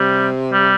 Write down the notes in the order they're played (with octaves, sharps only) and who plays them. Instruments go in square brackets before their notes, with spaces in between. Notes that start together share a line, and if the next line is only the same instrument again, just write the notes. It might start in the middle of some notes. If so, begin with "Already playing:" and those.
Already playing: [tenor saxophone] C3 [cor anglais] G3
[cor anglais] G3